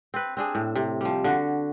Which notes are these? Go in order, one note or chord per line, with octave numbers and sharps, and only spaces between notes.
C4 B4
C4 D4 G#4
A2
C3
F3 G3
D3 F#4